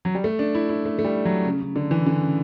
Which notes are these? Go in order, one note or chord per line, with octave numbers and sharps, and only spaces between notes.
F#3
G3
A3
D4
E4
E4
A3
A3
G3
F#3
C#3
C#3
D3
E3
D3
C#3